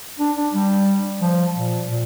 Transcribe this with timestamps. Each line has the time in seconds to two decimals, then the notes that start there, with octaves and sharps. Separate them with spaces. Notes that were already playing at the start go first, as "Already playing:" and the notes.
0.19 D4
0.37 D4
0.53 G3
1.22 F3
1.55 A#2
1.89 A#2